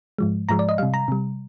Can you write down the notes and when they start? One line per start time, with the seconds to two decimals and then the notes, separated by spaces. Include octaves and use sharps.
0.18 G#2 F3 G#3
0.49 G#2 F3 G#3 A#5
0.59 D5
0.69 D#5
0.78 C3 G3 F5
0.94 A#5
1.08 C3 G3